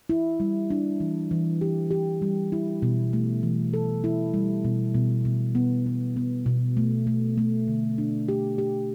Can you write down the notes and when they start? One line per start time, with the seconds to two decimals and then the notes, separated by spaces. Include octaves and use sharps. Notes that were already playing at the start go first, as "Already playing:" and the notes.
0.09 E4
0.40 G3
0.70 D4
1.00 E3
1.31 E3
1.61 G4
1.91 G4
2.22 G3
2.52 E4
2.82 B2
3.13 A3
3.43 E3
3.74 A4
4.04 E4
4.34 G3
4.64 B2
4.95 B2
5.25 B2
5.55 B3
5.86 B3
6.17 B3
6.46 B2
6.77 A3
7.07 A3
7.38 A3
7.68 D3
7.98 D4
8.29 G4
8.58 G4